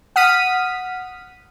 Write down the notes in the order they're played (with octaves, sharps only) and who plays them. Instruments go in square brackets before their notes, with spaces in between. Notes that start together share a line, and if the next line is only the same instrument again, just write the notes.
[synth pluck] F#5 D#6 F6 B6 D#7